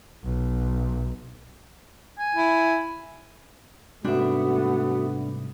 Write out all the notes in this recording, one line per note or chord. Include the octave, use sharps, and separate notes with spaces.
B1
G#5
E4
G#2 C3 G3 A3 B3 D4 F#4 E5